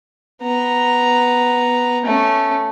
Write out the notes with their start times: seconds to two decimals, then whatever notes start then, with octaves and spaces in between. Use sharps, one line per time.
0.42 B3 A#5
2.05 A3 C#4